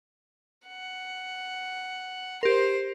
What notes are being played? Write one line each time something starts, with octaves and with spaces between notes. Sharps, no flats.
F#5
G4 A#4 C5 C6